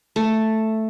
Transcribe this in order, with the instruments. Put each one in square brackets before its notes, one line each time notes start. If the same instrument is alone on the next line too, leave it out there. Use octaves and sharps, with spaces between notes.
[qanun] A3